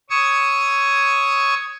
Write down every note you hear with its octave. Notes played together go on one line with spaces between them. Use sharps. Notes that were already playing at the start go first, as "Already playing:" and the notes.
C#5 C#6 D#6 E6 G#6